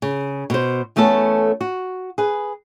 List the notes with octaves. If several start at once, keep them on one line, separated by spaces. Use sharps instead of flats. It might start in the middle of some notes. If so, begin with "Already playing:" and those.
C#3
B2 C5
E2 A3 B3 C#4 A4
F#4
G#4 B4